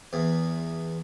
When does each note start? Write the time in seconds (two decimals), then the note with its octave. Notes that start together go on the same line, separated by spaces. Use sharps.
0.13 E2